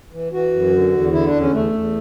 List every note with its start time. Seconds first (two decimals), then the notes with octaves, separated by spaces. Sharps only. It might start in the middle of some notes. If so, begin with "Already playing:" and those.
0.13 E3
0.32 E3 F#4
0.52 F#2
0.73 D3
0.93 E2
1.12 D3 E4
1.27 D4
1.33 E2
1.39 C#4
1.52 E2 A3
1.73 E2